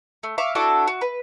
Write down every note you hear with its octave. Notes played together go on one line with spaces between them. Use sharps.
A3
E5 F5 C#6 D6
D4 E4 F#4 A4
F#4
B4